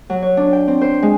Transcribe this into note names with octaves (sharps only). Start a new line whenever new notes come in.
F#3
C#5
D4
G5
C4
C5
G#3